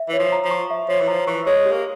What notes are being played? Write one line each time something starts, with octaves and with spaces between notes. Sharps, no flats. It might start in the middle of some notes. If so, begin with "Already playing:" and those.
Already playing: E5
E3 C#5
F3
A#5
F3
C#6
E5
F3 C#5
E3
F3 A#5
E3 C#6
G#3 C#5
G4
A#3